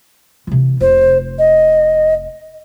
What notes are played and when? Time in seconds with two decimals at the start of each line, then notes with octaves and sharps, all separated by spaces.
0.47 C3 E3
0.80 F1 F4 C5
1.38 D#5